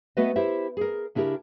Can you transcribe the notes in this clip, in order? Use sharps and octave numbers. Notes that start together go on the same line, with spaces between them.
A3 B3 F#4 B4 D#5
E4 G4 C5 E5
G#4 A#4
C#3 D4 E4 G4 A#4